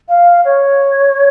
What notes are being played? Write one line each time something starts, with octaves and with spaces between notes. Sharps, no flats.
F5
C#5